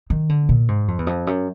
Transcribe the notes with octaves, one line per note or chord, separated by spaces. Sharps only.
D#3
D3
A#2
G#2
F2
E2
F2
F#2